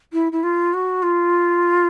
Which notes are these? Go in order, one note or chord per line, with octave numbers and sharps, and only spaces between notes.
E4
E4
F4
F#4
F4